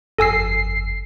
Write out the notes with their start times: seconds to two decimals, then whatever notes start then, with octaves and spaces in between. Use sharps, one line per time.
0.19 G1 F2 A4 G#5 E6 C7